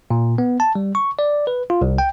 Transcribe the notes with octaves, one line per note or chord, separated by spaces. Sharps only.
A#2
B3
A5
G3
C#6
D5
B4
F4
C2
G5